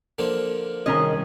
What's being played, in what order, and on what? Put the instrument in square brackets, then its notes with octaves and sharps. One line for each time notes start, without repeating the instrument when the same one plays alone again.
[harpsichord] D3 F3 A#3
[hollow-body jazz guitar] C2 C#4 A#4 [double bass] D#3 [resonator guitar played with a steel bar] G#4 D#5